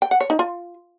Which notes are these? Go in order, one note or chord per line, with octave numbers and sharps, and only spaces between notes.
G5
F#5
C#5
D#4
F4